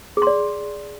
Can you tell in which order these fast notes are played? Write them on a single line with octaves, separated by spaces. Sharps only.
G#4 C6 D5